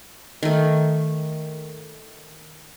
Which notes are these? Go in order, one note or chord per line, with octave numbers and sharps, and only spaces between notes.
D#3 A3